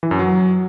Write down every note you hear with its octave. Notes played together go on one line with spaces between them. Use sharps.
E3
F#2
F#3